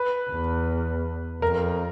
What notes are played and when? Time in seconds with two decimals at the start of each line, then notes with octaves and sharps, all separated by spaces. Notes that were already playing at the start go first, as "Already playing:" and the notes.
Already playing: B4
0.30 E2
1.42 F2 A#4